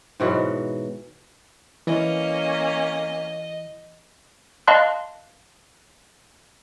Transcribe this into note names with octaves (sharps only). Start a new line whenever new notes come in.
G#2 B2 E3 F#3
E3 A#3 C#4 D#5
D#5 F5 A5 C6 F#6